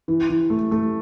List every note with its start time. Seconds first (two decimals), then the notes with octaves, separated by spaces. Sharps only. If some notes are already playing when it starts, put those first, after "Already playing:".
0.08 E3
0.29 E3
0.50 A3
0.71 A3